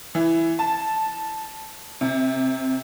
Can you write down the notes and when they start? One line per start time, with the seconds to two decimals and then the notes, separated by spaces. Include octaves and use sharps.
0.15 E3
0.59 A5
2.01 C3